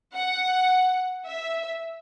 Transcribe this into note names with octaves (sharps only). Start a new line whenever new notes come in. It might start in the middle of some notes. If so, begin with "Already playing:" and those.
F#5
E5